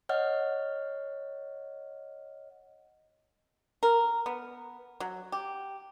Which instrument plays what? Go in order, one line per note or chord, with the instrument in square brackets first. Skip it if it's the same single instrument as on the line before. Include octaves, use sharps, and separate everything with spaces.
[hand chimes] C#5 D#5 F#5 F6
[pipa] A#4
B3
F#3
G4